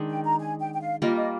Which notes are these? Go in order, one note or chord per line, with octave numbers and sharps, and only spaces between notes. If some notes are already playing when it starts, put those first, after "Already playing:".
Already playing: D#3 G#3 D4
G5
A#5
G#5
G5
G5
F5
G3 A#3 F4 D#5
D#5